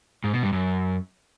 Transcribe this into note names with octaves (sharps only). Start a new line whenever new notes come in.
G#2
B2
G2
F#2